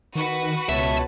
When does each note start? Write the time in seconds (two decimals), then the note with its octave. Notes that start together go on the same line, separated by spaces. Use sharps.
0.15 D#3 F#4 B4
0.69 C#2 B2 C#5 E5 A5